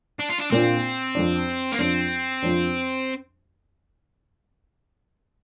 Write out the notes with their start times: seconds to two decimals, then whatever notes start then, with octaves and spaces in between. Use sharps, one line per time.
0.19 D4
0.29 F4
0.39 D4
0.51 A#2 A#3 C4 D4 F4
1.15 F2 F3 D4
1.73 A#3
1.79 F2 F3 C4 D4
2.43 F2 F3 D4